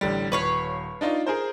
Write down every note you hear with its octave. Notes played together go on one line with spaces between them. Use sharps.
A1 D3 G3
D#1 B4 C#5 F5
D4 D#4 F4
G#4 A#4 C5